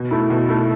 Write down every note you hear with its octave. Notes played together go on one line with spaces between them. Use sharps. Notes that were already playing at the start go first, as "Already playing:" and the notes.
Already playing: B2
A3 E4
B2
A3 E4